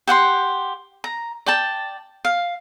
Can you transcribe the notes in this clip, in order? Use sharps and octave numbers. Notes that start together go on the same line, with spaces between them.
G4 F#5 G5 C6
A#5
D5 G5 A5
F5